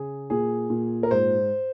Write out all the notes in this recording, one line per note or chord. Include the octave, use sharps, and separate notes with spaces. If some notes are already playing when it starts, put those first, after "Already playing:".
Already playing: C#3 G#4
A#2 G#4
A#2
A#4
G#2 C5